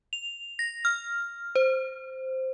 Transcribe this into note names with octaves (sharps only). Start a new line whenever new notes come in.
F7
A#6
F6
C5